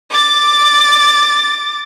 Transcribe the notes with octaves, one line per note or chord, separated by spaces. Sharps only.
D6 A6